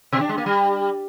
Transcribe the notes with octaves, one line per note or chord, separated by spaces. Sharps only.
B2
D4
G#3
A#3
G3